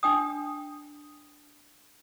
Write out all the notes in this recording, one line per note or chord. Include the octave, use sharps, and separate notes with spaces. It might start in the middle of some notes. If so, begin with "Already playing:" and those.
D4 G5 D#6